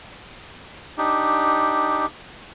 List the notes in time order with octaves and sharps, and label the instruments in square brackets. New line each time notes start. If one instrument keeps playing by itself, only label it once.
[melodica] D4 D#4 G4